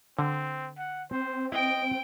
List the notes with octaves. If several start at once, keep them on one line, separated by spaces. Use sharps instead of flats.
D3 C4
F#5
C4 C5
E4 D#5 G5 D7